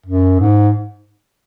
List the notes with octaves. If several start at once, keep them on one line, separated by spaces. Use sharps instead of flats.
F#2
G#2